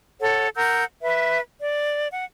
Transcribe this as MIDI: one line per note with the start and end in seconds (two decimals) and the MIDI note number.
0.21 0.48 69
0.21 0.48 73
0.21 0.48 78
0.56 0.84 70
0.56 0.84 78
0.56 0.84 88
0.56 0.84 91
1.02 1.40 71
1.02 1.40 76
1.62 2.06 74
2.11 2.24 78